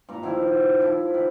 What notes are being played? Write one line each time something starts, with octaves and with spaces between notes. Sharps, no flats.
G2 A#2 A#5
B2 D#3 F3 E4
C5
F3 E4 A4
D#3 B4